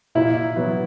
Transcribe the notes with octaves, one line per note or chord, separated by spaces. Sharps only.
A#2 E4
F#3 B3